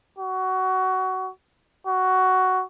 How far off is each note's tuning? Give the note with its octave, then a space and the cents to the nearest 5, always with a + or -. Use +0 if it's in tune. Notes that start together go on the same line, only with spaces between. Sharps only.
F#4 +20
F#4 +10